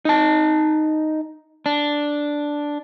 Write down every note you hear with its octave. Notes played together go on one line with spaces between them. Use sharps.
D#4 A5
D4